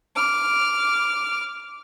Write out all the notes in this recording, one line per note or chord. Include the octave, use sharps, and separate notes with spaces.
D6 F6